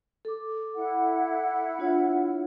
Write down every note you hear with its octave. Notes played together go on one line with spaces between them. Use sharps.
A4 D6
E4 F#5
D4 F4 C#5